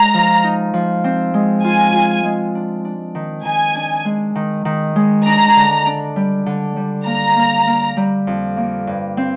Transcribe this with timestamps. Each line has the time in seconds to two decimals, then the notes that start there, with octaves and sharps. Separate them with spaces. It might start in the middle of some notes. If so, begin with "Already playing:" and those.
Already playing: G#3 A#5
0.14 F3
0.44 D#4
0.74 F3
1.04 C4
1.34 G#3
1.64 F4 G#5
1.94 F4
2.24 G#3
2.55 D4
2.85 D4
3.15 D#3
3.45 D#3 G#5
3.75 D4
4.05 G#3
4.35 D#3
4.65 D#3
4.96 G#3
5.26 D4 A#5
5.56 D3
5.86 D4
6.16 G3
6.46 D3
6.76 G3
7.06 A#3 A#5
7.36 A#3
7.67 A#3
7.97 G3
8.27 F2
8.57 A#3
8.87 G2
9.17 C4